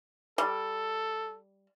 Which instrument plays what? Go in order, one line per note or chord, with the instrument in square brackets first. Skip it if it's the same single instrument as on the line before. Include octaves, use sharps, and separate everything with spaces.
[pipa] G3 [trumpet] A4